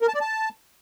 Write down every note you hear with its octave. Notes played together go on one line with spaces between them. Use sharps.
A#4
A5
D5
A5